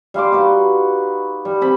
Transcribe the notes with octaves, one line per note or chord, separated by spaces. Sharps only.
G3 F5 C6 D6
D#4 F#4 B4
G3
C4 B5